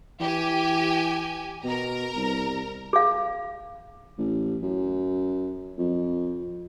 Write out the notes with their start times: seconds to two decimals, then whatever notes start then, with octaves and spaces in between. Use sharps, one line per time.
0.20 E3 G4 G#5
1.64 B2 A#4 A#5
2.16 C2
2.93 G#4 F5
4.18 A1
4.62 F#2
5.77 F2